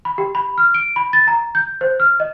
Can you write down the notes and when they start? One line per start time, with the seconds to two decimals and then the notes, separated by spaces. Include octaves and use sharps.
0.05 B5
0.18 G4
0.35 B5
0.58 F6
0.74 D7
0.96 B5
1.13 A6
1.27 A#5
1.55 G6
1.81 C5
2.00 F6
2.20 D#5